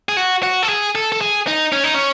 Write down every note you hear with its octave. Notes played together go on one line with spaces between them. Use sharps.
G#4
F#4
F#4
A4
G#4
A4
A4
G#4
D#4
C#4
D#4
C#4